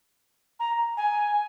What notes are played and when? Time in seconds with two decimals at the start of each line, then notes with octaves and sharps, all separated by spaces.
0.60 A#5
0.97 G#5